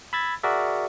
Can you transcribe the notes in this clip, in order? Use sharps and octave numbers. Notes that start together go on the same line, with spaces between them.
B5 E6 G#6 A6
F#4 G#4 A#4 D5 E5